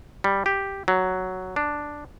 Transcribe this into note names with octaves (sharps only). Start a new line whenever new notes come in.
G3
G4
F#3
D4